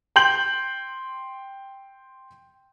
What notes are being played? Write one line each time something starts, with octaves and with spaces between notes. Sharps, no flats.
G5 C6 G6 F#7